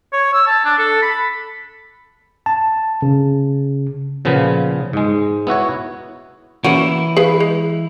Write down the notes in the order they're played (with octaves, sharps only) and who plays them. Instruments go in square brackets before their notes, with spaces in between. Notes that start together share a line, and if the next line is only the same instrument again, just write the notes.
[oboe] C#5
E6
A5
D4
A4
B5
[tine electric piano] A5
C#3
[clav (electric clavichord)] A#2 C#3 F3 B3
G#2 G#3
B3 E4 F#4 C#5
[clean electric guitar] E3 E4 [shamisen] A#3 C#4 F#4
[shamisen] G#4 B4 F5
G#3